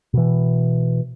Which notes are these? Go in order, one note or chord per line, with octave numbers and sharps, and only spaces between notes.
B2 E3